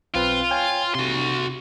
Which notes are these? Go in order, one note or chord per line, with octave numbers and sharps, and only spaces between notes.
B1 C4 F4 B4
C#5 G5 G#5
C3 F#4 C6